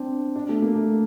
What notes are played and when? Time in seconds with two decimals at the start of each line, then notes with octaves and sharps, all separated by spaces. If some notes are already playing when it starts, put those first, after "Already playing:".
Already playing: C4 D4
0.36 D4
0.49 A3
0.62 A#3
0.75 A3